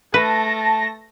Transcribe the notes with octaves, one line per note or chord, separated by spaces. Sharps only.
A3 B4 A5 A#6